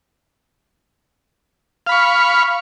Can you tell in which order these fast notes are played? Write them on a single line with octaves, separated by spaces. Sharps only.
F5 B5 C#6